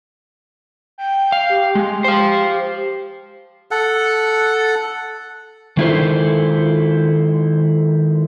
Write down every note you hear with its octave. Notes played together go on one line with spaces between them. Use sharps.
G5
F5
G4
G#3
C5 F5
A4 F#5
D#3 G#3 E4 F4 A4 C5